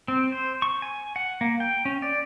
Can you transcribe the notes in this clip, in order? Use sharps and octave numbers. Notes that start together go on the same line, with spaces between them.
C4
C5
C#6
G#5
F#5
A#3
G5
C#4
D5